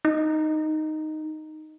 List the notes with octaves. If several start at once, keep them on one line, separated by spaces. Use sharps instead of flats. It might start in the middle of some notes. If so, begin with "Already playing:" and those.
D#4